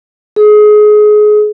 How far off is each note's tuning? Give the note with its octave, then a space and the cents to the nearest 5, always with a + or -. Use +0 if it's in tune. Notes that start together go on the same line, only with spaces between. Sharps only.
G#4 +25